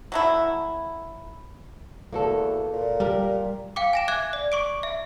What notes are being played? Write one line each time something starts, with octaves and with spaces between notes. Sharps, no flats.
F#3 A3 E4
E2 A#3 F#4 A4
A#2
G3 G4 A#4
F5 G5 D6
G#5 A#6 E7
E5 D6 F#6 G#6
D5
C#6 D6 D7
E5